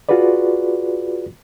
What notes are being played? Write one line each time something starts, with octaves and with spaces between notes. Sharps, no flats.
F4 F#4 G#4 B4 D5